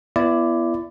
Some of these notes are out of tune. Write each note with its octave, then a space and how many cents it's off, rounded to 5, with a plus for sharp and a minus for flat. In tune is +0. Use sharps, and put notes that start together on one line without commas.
B3 +0 E4 +30 D5 +0